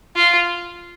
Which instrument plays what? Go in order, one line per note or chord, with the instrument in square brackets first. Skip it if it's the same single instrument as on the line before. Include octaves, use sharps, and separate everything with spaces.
[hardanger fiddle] F4